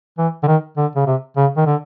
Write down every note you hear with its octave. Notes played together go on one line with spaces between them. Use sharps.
E3
D3
D#3
D3
C#3
C3
C#3
D#3
D3